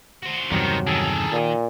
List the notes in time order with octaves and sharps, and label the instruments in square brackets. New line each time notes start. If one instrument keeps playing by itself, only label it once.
[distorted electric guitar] F#4 C5
[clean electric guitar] E2 G2 C3 [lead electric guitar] D#3 [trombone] F#3
[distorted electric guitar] D#3 [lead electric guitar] G#4 A4
[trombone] A#2